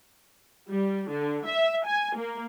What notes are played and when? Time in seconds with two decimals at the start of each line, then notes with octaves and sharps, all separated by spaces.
0.70 G3
1.09 D3
1.46 E5
1.85 G#5
2.16 A#3